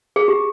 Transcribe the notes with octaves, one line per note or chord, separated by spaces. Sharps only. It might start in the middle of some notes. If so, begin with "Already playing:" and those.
G#4
G4